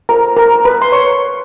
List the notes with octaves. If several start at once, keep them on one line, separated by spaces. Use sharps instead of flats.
F4 A4 A#4 C5 A#5
A#4 A#5
B4 B5
C6
C#5 C#6